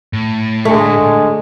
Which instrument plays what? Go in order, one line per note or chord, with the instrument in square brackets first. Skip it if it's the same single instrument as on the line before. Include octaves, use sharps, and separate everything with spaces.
[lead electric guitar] A2
[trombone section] D3 G#3 [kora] A3